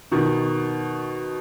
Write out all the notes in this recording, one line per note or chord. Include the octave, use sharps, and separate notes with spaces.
B2 D#3